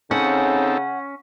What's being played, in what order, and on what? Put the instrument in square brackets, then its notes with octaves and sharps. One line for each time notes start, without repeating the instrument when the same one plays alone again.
[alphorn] C#3 [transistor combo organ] C4 D#4 A4 [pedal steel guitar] C#4 [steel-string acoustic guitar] F#5